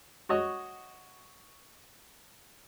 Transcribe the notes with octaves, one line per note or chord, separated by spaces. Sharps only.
F#4 C#5 D#5